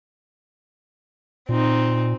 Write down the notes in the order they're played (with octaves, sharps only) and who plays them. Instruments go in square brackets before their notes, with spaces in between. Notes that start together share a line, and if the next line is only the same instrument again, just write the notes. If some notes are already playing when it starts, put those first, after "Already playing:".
[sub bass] A#2 [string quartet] C4 D#4